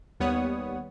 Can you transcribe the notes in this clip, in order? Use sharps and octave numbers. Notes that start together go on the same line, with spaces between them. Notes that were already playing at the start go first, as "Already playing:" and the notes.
D#2 G3 B3 C#5 F#5 D#6